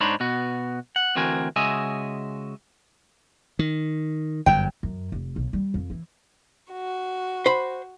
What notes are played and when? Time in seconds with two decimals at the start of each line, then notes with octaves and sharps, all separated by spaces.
0.01 G#2 D4 D#4 C5 C#5 B5
0.20 B2 B3 F#4
0.96 F#5
1.15 D2 E3 C4 F#4 A#4 G#5
1.56 C#3 G#3 F#4 D#5 E5 G#5
3.59 D#3
4.46 G1 F#2 G5
4.83 F#2
5.12 F1
5.36 B1
5.53 G3
5.74 F2
5.90 E3
6.71 F#4
7.46 C5 B5